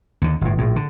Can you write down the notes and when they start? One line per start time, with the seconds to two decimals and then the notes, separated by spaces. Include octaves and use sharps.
0.22 D#2 D3
0.41 G1 A2
0.58 A#1 A2
0.76 D3